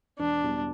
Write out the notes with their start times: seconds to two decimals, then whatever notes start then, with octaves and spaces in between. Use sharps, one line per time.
0.18 E1 D4
0.42 E2 B2 G3